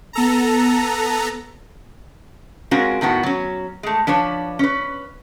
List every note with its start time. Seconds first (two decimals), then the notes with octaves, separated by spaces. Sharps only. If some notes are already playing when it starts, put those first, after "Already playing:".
0.13 B3 A4 A#5
2.71 G#3 C4 C#4 F4 F#4 A#4
3.01 A2 D#3 B3 F#4
3.23 F#3 C#4
3.83 G#3 A3
4.07 F3 D4 B4 C#5
4.59 C#4 B4